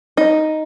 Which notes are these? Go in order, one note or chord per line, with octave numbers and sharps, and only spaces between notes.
D#4